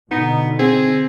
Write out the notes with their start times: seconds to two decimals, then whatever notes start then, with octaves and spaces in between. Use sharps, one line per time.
0.11 B2 D3 B3 D#4
0.59 C4 G#4